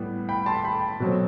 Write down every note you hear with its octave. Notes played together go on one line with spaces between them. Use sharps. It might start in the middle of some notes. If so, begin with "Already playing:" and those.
Already playing: A2 G3 B3
G5 B5
A5 C6
G5 B5
B2 F#3 A3 C4